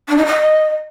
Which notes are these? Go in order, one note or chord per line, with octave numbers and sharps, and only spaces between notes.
D4
D#4
D#5